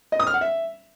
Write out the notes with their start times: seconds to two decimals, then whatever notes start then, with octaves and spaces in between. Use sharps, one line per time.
0.12 D#5
0.19 D#6
0.27 F6
0.34 F#5
0.41 E5